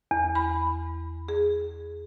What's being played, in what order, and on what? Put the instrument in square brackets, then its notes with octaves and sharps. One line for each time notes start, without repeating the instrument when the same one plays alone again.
[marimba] E2
B5
G#4